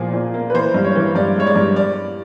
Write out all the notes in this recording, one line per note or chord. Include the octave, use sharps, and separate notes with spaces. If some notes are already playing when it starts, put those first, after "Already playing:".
Already playing: A#2 F3 A#3 G#4
A#2
A#3
B4
E3 C5
G2
C#5
E3
G2 D5
G#3 C#5
D5
G2
D5